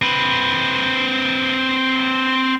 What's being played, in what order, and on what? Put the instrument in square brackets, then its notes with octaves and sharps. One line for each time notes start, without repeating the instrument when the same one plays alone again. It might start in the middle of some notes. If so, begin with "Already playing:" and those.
[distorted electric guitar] C4 B4